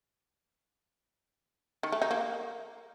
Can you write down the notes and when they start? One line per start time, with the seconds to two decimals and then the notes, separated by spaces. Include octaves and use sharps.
1.83 D#3
1.92 A3
2.02 D#4
2.11 A#3